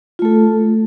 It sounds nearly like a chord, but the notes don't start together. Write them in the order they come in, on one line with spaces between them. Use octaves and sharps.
F4 A3 A4